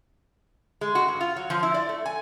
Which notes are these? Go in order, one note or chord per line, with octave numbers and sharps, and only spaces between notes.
G#3
F#4
G2
F4
F#3
F3
E4
D5
A3
G#5